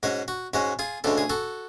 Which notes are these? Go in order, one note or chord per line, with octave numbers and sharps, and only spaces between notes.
G#2 G#3 C#4 F#4
F#4
G#2 G#3 C#4 F#4
F4 G#4
D2 C#3 G#3 A4
G#4
F#4 A4